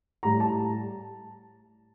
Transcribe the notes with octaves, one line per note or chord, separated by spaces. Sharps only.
A2 G3 A#5
A5